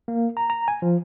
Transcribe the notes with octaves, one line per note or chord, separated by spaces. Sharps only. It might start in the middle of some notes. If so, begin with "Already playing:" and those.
A#3
A#5
A#5
G#5
F3